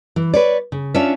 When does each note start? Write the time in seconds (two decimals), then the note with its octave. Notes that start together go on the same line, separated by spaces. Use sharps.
0.16 E3
0.34 B4 C#5 D5
0.72 C#3
0.94 C#4 D4 F4 C#5 D5 E5